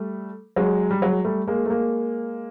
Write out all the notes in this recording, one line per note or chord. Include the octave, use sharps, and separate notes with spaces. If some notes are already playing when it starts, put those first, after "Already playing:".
Already playing: G3 A3
F#3 G#3
G3
F#3 G#3
G3 A3
G#3 A#3
A3
G#3 A#3